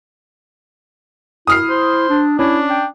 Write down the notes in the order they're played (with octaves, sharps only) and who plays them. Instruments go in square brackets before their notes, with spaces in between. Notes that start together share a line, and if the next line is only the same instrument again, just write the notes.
[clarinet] E4 [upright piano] D#6 F6 C7
[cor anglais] C5
[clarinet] D4
[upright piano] C#4 [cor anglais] D4 [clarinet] E4
[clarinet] G5